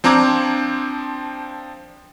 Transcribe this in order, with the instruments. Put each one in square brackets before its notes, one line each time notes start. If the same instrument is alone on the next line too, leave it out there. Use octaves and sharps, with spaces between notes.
[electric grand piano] F3 C4 D4 A#5 D6 G#6